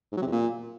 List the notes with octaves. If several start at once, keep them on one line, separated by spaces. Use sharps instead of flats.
G#2
F#3
C3
E2
A#2